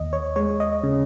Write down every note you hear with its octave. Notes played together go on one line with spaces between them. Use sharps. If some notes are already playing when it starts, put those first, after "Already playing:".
Already playing: D#2 D#5
C#5
G#3 C#5
D#5
C#3